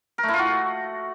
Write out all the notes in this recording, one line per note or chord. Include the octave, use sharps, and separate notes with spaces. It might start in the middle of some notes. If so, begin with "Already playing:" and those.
A#4
A3
E4
F4
F#4